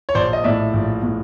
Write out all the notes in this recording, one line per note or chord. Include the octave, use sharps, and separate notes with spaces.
C#5
A#1 C5 D5
D#5
A2 D5 E5
A#1
A2